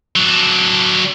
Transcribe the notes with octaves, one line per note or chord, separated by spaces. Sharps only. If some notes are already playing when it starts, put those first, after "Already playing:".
F#3 D4